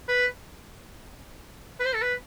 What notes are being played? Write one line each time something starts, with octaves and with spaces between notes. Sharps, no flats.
B4
B4
C5
A4
B4